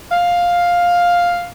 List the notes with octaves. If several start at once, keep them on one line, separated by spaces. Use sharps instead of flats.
F5